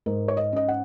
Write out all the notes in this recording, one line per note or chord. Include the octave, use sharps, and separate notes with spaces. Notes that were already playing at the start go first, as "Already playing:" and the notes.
G#2 A#4
C#5
D#5
C#4 D#5
F#5